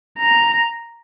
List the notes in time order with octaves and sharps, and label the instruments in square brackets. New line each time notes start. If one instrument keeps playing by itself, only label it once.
[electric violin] A#5